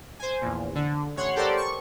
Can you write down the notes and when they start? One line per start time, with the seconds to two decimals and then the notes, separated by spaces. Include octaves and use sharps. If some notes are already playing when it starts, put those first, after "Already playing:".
0.19 C5 G#5
0.41 A#1 E2
0.75 D3
1.16 A1 C#5 F#5 C6
1.36 G4 A4 A#4 C5 D5
1.57 C#6